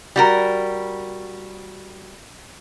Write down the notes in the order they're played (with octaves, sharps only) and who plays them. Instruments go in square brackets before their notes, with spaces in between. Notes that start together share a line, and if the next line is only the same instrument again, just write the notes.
[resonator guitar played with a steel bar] G3 F#4 A#4